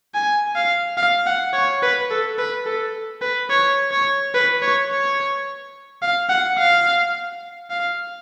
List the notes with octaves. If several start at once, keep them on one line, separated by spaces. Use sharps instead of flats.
G#5
F5
F5
F#5
C#5
B4
A4
B4
A4
B4
C#5
C#5
B4
C#5
C#5
F5
F#5
F5
F5